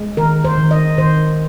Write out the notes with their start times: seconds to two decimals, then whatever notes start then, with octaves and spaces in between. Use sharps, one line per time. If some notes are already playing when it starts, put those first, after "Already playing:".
Already playing: G#3
0.17 D#3 A#4
0.44 C5
0.58 D#3
0.71 D#5
0.98 D#3 C5